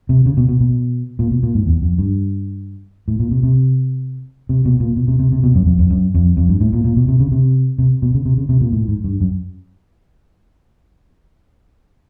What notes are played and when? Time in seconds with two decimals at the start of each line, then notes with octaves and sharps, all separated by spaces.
0.09 C3
0.26 C#3
0.37 B2
0.49 B2
0.61 B2
1.19 A#2
1.31 B2
1.43 A#2
1.55 G#2
1.66 E2
1.82 F2
1.98 G2
3.08 A2
3.20 A#2
3.31 C3
3.43 C3
4.49 C3
4.65 B2
4.80 A#2
4.96 B2
5.08 C3
5.19 C3
5.32 C3
5.43 B2
5.55 F#2
5.67 F2
5.79 F2
5.90 F#2
6.14 F2
6.37 F2
6.49 G2
6.61 A2
6.73 A#2
6.84 A#2
6.97 B2
7.08 C3
7.19 C#3
7.32 C3
7.79 C3
8.02 B2
8.14 C#3
8.26 C3
8.38 C#3
8.49 C3
8.61 A#2
8.73 A2
8.88 G#2
9.04 G2
9.21 F#2